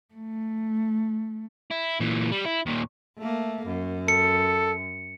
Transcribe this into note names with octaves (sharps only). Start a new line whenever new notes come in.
A3
E4
A#2 E3
G3
E4
D#2 A#2
A3 A#3
F#2
A4 C#7